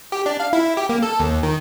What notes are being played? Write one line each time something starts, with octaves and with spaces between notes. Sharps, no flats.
G4
D4
F5
E4
G4
A#3
A4
D#2
D#3